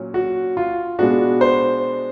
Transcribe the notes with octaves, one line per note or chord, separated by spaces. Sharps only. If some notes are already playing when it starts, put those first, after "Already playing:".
Already playing: A#2 F#3 C#4
F#4
F4
B2 G#3 B3 D4 F#4
C5